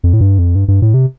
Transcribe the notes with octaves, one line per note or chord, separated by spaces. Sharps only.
F2
A2
G2
F2
G2
G2
A2
C3